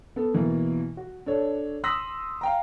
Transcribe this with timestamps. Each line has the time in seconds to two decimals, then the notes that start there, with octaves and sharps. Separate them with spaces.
0.16 B3 A4
0.34 B2 E3 A#3
0.97 F#4
1.26 D4 A4 C#5
1.84 C6 D#6 E6 A#6 B6 F#7
2.41 F5 G5 A#5